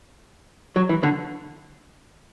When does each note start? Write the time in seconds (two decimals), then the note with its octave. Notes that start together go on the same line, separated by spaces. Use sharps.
0.76 F#3
0.89 E3
1.03 D3